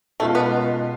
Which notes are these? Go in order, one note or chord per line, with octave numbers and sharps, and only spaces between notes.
B2 G#3 A3 C#4 F4
B3